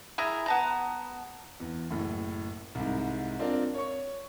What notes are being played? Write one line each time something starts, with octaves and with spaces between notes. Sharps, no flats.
E4 G#4 A#4 A#5
B3 A5 A#5
E2
F#1 A2
C2 G#2
C4 D4 F4 A#4 D5
C#5 C#6